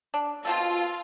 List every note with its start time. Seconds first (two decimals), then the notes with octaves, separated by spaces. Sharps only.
0.14 D4
0.45 B2 C4 F4 A4